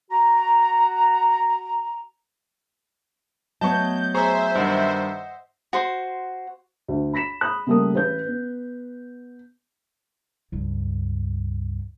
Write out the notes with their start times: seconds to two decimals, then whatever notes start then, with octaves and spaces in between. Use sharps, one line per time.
0.10 F#4 A#5
3.61 F#3 A3 B3 C#5 D#5 A5 C#6 G6
4.14 G#4 C5 E5 A#5 C#6
4.55 G2 D#3 D#5 F#5
5.73 F#4 C5 C6
6.88 D2
7.13 B5 A#6 B6 E7
7.41 B5 D#6 F#6
7.67 C#3 G3 A3 A#3 A#4 D#6
7.94 A1 B4 G6
8.26 B3
10.52 C#2 G2